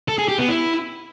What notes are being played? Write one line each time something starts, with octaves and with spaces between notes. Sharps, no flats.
A4
G#4
G4
B3
E4